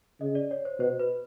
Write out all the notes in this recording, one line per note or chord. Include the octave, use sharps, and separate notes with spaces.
C#3 D#5
D5
C#5
C5
B2 C5
B4